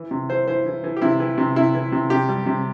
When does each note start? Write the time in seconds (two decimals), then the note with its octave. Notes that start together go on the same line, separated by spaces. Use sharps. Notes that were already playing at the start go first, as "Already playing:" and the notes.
Already playing: E3
0.11 C3
0.29 E3 C5
0.47 E3 C5
0.66 E3
0.84 E3
0.97 G4
1.02 C3 E4
1.20 E3
1.38 C3
1.56 C3 E4
1.74 E3
1.92 C3
2.10 C3 G4
2.29 G3
2.46 C3